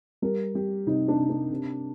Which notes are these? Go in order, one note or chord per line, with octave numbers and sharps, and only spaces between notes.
G3 A#4
G3 G4
C3 D#4
D4
C3
D4
C3